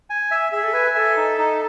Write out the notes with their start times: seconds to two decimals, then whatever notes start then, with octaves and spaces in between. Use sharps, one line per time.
0.10 G#5
0.31 E5
0.52 G#4 E5
0.63 A4
0.73 B4 G#5
0.95 A4 E5
1.17 D#4
1.38 D#4